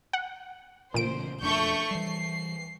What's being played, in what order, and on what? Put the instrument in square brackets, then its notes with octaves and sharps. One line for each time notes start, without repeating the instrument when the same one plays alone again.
[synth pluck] F#5
[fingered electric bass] A1 C#3 [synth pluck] A#2 D7 [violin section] C5
[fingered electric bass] E1 F2 D4 [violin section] A3 C#6 G6
[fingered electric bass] E3 G3 [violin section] C7